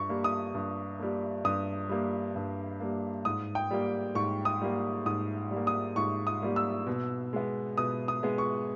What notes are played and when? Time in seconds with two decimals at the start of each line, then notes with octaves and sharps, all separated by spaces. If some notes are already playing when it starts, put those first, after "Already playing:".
Already playing: G2 C#6
0.09 G3 A#3
0.24 D#6
0.54 G2
0.99 G3 A#3
1.44 G2 D#6
1.89 G3 A#3
2.35 G2
2.80 G3 A#3
3.25 G#2 D#6
3.55 G5
3.71 G3 A#3
4.15 G#2 C#6
4.45 D#6
4.62 G3 A#3
5.06 G#2 D#6
5.51 G3 A#3
5.67 D#6
5.96 G#2 C#6
6.27 D#6
6.42 G3 A#3
6.56 E6
6.86 B2
7.33 G#3 B3
7.78 B2 D#6
8.08 D#6
8.23 G#3 B3
8.38 C#6